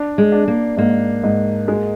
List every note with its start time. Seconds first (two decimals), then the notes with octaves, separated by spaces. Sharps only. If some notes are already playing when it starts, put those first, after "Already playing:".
Already playing: D4
0.18 G#3
0.32 D4
0.48 A#3
0.77 G#2 A#3
1.23 G#2
1.68 G#3